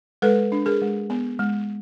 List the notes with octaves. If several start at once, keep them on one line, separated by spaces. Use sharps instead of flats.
G#3 A4 B4
D4
G#4 A#4
G#3
B3
G#3